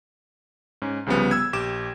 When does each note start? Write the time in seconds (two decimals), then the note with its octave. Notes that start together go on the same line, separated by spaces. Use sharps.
0.82 G#2 C#4
1.06 C2 C#3 F3 G3 B3
1.31 E6 G#6
1.53 A#1 G4 D6 E7